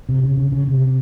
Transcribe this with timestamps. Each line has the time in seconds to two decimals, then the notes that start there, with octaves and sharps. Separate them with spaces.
0.09 C3
0.23 C#3
0.37 C#3
0.52 C#3
0.68 C3